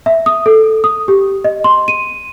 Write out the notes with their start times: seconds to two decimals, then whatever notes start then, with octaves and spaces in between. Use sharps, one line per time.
0.06 E5
0.26 D#6
0.46 A4
0.84 D#6
1.08 G4
1.44 D#5
1.64 C6
1.88 D#7